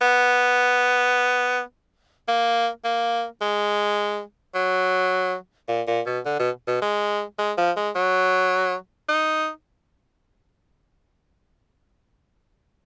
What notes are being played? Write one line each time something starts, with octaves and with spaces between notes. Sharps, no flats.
B3
A#3
A#3
G#3
F#3
A#2
A#2
B2
D3
B2
B2
G#3
G#3
F3
G#3
F#3
D#4